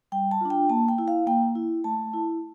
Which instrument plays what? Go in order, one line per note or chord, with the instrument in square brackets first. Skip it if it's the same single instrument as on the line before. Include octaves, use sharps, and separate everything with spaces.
[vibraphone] G3 G5
A5
D4 F4
G5
A#3 A5
G5
E4
F5
A#3 G5
E4
A3 A5
E4